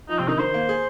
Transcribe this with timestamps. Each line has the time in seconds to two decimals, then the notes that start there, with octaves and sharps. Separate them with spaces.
0.09 F3 D#4
0.19 C3 C4
0.28 D#3 D#4
0.39 D#3 C5
0.54 A#3
0.69 G#4